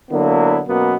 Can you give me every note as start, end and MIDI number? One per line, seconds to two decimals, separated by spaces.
0.11 0.61 50
0.11 0.61 54
0.11 0.61 58
0.11 0.61 59
0.11 0.61 64
0.68 0.95 42
0.68 0.95 47
0.68 0.95 58
0.68 0.95 59